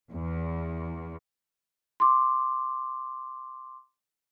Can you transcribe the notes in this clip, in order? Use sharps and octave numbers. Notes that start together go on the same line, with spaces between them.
E2
C6 D6